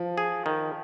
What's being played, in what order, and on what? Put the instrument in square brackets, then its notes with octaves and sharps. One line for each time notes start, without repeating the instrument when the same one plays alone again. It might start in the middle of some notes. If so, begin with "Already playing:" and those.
Already playing: [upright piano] F3
[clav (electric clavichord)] G#4
D#3